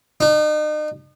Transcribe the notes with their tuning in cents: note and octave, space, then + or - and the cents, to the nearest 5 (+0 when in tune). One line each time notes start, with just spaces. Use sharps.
D#4 -40